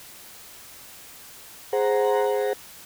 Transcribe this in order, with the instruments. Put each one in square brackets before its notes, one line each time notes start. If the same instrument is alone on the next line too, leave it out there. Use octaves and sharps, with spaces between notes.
[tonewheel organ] G#4 C5 F#5 A#5